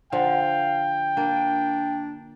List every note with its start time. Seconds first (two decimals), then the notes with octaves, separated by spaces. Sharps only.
0.13 D3 F3 F5 G5
1.17 A#3 D4